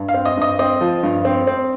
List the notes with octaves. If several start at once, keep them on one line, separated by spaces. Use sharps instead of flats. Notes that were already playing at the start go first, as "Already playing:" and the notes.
Already playing: G2
F5
C4
D#5
G2 D#5
C4 D#5
F3
G2
C4
C4